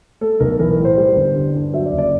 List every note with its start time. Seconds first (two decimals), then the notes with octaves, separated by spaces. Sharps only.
0.21 A3 A4
0.40 B1 A#4
0.59 E3 A#4
0.72 A#4
0.79 A2
0.85 C5
0.97 G3
1.16 G1
1.36 D3
1.54 G2
1.73 F#3 E5
1.86 D5
1.92 F#1
1.98 D5